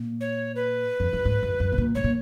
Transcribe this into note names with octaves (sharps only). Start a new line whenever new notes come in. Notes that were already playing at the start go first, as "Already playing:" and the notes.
Already playing: A#2
C#5
B4
F2
F#2
G#2
F#2
F#2
B2
A#2
G#2 C#5
A#2